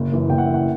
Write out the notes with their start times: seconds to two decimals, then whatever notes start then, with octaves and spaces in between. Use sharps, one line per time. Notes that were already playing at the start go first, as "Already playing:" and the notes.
Already playing: F#1
0.12 F#2 E3
0.30 F#1 G5
0.38 F#5
0.46 E3 E5
0.54 F#5